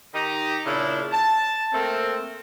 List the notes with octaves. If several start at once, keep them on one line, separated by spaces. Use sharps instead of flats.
D#3 D#4 G4 D#5 A#5
A#2 C#3 D4 E4
A5
A3 A#3 C4